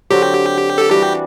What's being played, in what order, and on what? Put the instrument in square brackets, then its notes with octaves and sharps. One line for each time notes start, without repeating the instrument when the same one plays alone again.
[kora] D3 F#3 C4 F#4 [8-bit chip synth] G4
[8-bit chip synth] A4
[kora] E3 G3 D4 F#4 [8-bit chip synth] G4